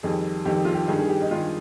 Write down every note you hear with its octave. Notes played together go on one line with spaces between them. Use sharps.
F2 D#3 G3 G#4
F2 D#3 G3 G4
F4
G4
G2 D#3 G3 G#4
G#4
G4
D#4
G2 D#3 G3 F4